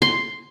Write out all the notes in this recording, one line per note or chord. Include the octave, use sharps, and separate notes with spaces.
C6